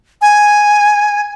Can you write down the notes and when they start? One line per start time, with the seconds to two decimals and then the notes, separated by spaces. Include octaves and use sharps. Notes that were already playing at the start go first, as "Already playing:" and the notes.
0.22 G#5